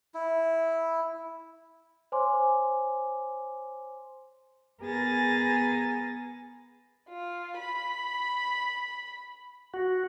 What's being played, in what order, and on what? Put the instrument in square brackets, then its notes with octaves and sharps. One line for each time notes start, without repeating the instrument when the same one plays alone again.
[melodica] E4
[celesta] C5 C#5 G#5 C6 D6
[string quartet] B3 G#4 A#4 G#5 A6 A#6
[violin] F4
B5
[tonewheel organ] F#4